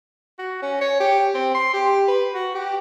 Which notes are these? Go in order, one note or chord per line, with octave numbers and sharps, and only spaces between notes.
F#4
C#4
C#5
G4
C4
C6
G4
B4
F#4
G4